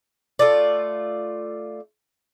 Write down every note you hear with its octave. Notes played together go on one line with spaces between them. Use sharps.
A3 F4 D5